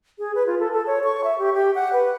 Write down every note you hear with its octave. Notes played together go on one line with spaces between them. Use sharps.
G#4
B4
F4
A4
A4
C#5
C#6
E5
G4
G4
F#5
B4